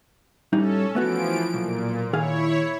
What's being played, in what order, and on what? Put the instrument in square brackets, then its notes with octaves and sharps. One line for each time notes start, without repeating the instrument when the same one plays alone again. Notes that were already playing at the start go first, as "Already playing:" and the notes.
[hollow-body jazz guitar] A2 G3 D#4 [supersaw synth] C#4 A4
[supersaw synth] E3 F3 D7 [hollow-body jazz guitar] A3 B3 F#4
[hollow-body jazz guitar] B1 [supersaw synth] A#2
[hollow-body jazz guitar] D#3 G#4 F5 [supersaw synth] E4 C#5